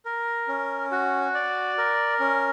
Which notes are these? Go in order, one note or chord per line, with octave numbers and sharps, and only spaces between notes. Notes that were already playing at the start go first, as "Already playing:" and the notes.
A#4
C#4
F#4
D5
A#4
C#4